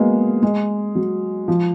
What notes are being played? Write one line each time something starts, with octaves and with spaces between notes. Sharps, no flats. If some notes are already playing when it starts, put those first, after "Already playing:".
Already playing: F#3 G#3 A#3 B3
G#3
F#3
F3